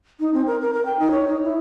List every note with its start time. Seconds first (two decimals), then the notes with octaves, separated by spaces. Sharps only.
0.20 D#4
0.34 C4
0.47 A#4
0.61 A#4
0.73 A#4
0.85 G5
0.99 D#4
1.11 C#5
1.28 D#4
1.44 E4